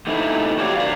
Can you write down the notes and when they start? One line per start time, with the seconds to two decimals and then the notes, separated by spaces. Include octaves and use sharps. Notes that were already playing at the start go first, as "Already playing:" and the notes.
0.07 A3 D#4 E4
0.59 F#4 G4 C#5 D5 F5
0.75 D3 D5 F5